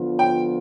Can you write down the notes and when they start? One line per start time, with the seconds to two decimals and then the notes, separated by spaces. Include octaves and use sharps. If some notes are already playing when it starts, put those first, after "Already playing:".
Already playing: D3 F3 B3 F4
0.19 G5